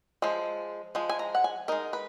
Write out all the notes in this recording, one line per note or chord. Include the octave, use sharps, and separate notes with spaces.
F3 G#3
F3 G#3
G#5
A#5
F#5
G#5
G#3 D#4 A#4
B4